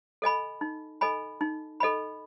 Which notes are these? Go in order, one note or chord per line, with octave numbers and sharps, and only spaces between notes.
A4 D#5 G#5 B5
D#4
A4 D#5 G#5 B5
D#4
A4 D#5 G#5 B5